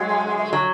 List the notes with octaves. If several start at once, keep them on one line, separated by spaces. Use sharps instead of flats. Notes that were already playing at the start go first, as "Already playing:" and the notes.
Already playing: F#3 G#3
F#3